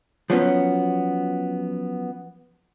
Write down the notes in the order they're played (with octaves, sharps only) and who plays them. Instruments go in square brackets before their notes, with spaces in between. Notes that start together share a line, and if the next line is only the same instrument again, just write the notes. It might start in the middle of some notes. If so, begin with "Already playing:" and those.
[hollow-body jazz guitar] F3 F#3 B3 C#4